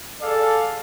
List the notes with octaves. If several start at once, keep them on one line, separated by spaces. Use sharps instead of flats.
G#4 A4 D5 F5